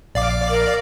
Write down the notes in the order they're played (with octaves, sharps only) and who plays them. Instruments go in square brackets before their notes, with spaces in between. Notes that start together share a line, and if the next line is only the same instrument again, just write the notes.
[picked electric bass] A#1 [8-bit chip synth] D5 F5 D6
[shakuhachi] A#4